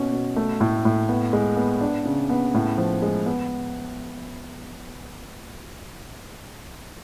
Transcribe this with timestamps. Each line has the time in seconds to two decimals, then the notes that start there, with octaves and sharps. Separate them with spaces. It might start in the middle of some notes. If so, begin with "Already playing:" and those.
Already playing: B2 C#4
0.12 B2
0.36 A3
0.60 A2
0.85 A2
1.09 B3
1.33 G#3
1.57 B3
1.81 D4
2.05 C#3
2.30 B3
2.54 A2
2.78 F3
3.02 G#3
3.26 B3